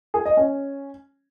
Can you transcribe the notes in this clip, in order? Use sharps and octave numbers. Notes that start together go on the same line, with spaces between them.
G#4
D#5
C#4